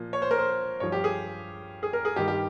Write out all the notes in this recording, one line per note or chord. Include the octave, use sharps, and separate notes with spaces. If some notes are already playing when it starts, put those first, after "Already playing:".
Already playing: A#2 F3
C#5
C5
A#4
C5
G2 F3 C#5
G4
G#4
G#4
A#4
G#4
G2 D#3 G4
G4